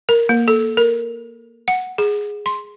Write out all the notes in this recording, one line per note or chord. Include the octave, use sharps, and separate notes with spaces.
A#4
A#3
A4
A#4
F#5
G#4
C6